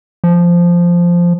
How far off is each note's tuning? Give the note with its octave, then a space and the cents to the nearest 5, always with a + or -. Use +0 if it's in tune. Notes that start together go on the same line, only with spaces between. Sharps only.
F3 -5